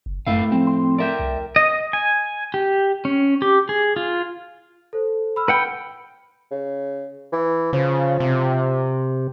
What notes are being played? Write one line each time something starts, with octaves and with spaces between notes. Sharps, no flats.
F#1
F#2 A2 A3 E4 F5
F3 C4
C6
A#4 D5 E5 G5
C2
D#5
G#5
G4
C#4
G4
G#4
F4
A4 C5
B5 E6 F6
B4 F#5 G5
C#3
E3
C#3 F3
C3